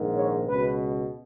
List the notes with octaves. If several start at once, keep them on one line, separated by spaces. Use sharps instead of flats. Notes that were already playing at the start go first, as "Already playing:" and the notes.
Already playing: A#1 G#2 D#3
C#5
C#2 B2 B4